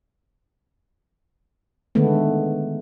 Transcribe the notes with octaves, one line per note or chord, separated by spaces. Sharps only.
D3 D#3 G#3 A3 B3